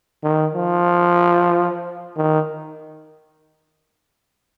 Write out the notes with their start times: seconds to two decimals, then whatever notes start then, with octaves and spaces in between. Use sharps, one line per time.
0.23 D#3
0.55 F3
2.17 D#3